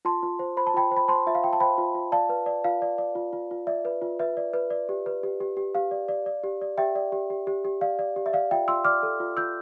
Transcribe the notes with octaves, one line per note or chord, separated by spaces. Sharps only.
F4 A5 C6
F4
C5
C5 B5
A5
F4 G5 B5
C5
B5
C5 A5 C6
F4 E5
F5
F4 G5
A5
C5 G5 B5
F4
F4
D5 F5 A5
B4
D5
F4 F5
D5
D5
F4
F4
F4
D5 E5
B4
F4
B4 E5
D5
B4
D5
G4
B4
G4
G4
G4
G4 F5
D5
D5
D5
G4
D5
G4 E5 G5
D5
G4
G4
G4
G4
D5 F5
D5
G4
E5
D5 F5
F4 E5 G5
F4 C6 E6
D5 D6 F6
A4
F4
F4 E6 G6